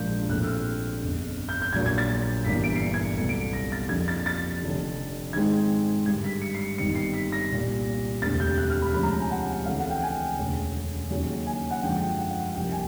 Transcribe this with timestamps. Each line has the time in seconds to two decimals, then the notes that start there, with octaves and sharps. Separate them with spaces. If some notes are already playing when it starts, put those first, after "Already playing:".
Already playing: A#1 G#2 F3 A#3 D4 G6
0.29 A#1 A2 F3 A3 C4 F#6
0.42 E6
0.47 F6
1.01 G1 F2 C#3
1.49 G6
1.62 G6
1.73 A#1 A#2 F#3 A#3 G#6
1.86 G#6
1.98 A6
2.45 G1 G2 E3 G3 A#3 B6
2.64 D7
2.76 C7
2.82 C#7
2.94 G#6
3.17 C2 B2 F#3 A3 C#7
3.29 D7
3.53 A#6
3.72 A6
3.89 F2 C#3 F3 A#3 D4 G#6
4.08 A6
4.26 A6
4.62 F1 F2 D3
5.33 G#2 D#3 G#3 C4 G#6
6.06 G2 D3 G3 G#6
6.24 B6
6.42 C#7
6.55 C7
6.60 C#7
6.78 G1 G2 D#3 G3 C4 C#7
6.95 C7
7.14 B6
7.32 A#6
7.50 C2 A#2 G3
8.22 E1 D2 C3 A6
8.40 G6
8.58 F#6
8.70 F6
8.82 B5
8.94 D2 C3 F3 G#3 C#4 B5
9.03 A#5
9.12 A5
9.21 G#5
9.31 F#5
9.49 F#5
9.66 D2 C#3 E3 A3 C4 F5
9.79 F#5
9.90 G5
10.03 G#5
10.38 E1 D2 C#3
11.10 D#2 C#3 F#3
11.47 G#5
11.71 F#5
11.83 F#2 D3 F3 G#3 G5
12.01 G5
12.19 F#5
12.30 F5
12.43 F#5
12.54 C2 C3 F3 A#3 G5
12.72 G#5